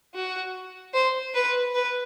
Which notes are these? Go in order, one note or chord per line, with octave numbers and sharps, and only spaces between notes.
F#4
C5
B4
B4